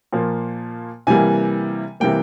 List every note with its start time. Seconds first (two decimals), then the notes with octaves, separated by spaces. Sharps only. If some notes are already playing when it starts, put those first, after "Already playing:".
0.13 A#2 F3 A#3
1.07 C3 E3 G3 A#3 G#5
2.00 C3 E3 G3 A#3 G5